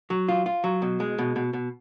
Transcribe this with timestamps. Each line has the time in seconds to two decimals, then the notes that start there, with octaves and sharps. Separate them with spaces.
0.10 F#3
0.28 F4
0.46 F4
0.64 F#3
0.82 B2
1.00 G#3
1.18 B2
1.36 B2
1.53 B2